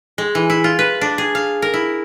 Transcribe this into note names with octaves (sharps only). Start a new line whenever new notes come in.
G#3
E3
E4
F4
B4
D4
G#4
F5
A#4
E4